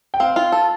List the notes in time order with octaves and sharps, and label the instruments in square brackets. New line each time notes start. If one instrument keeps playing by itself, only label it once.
[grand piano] G5
[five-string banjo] C4 [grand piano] F5
[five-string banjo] F4
A4